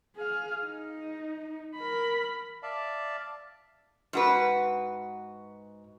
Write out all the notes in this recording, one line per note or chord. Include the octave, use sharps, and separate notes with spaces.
G#4 F5
D#4
A#4 B5
D5 E5 F5 A5
G#2 F#4 B4